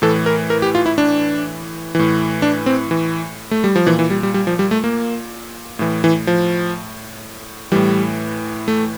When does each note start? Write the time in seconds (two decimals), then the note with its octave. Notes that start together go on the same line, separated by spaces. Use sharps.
0.02 A2 E3 A4
0.26 A#4
0.50 A#4
0.62 G4
0.75 F4
0.86 E4
0.98 D4
1.95 A2 E3
2.42 D4
2.66 C4
2.91 E3
3.51 A3
3.64 G3
3.76 F3
3.86 A#2 E3
3.99 E3
4.10 G3
4.23 G3
4.34 G3
4.47 F3
4.59 G3
4.71 A3
4.84 A#3
5.79 A2 E3
6.04 E3
6.27 F3
7.72 A2 E3 G3
8.68 A3